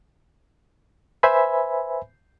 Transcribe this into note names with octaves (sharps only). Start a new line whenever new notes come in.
B4 C5 E5 G#5 B5